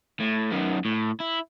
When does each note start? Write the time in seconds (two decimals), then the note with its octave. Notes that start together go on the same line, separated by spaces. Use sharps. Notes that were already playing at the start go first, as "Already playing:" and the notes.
0.20 A2
0.52 F#2 D#3
0.85 A2
1.20 E4